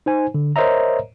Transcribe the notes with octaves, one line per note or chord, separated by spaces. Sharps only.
D#4 C5 G#5
D3
A#4 C5 C#5 D#5 E5 A#5